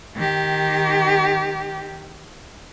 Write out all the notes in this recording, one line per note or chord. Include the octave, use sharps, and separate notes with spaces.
D#3 G4